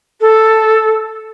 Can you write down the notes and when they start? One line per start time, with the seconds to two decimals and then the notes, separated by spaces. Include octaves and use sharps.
0.20 A4